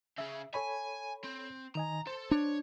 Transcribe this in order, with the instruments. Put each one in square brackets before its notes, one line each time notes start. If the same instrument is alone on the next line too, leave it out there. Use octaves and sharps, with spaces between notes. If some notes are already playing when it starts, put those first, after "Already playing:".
[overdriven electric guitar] C#3 G#4 [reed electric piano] E5
[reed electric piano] A4 C#5 B5 [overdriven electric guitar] G#5
[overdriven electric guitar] C4
[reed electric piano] D#3 D#5 G#5 [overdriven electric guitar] A#5
[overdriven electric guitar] A4 [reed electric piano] C5
[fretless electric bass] D4 [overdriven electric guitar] C#5